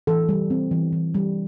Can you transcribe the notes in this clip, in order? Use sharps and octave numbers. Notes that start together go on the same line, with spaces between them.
E3 A4
G3
C4
E3
E3
G3